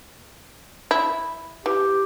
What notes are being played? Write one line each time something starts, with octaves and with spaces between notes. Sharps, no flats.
E4
E3 G4